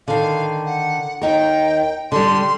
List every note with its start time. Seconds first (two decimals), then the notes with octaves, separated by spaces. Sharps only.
0.08 D3 D#3 F5
0.66 F#5
1.22 D#2 D#4 A#4 G5
2.12 D3 G3 C6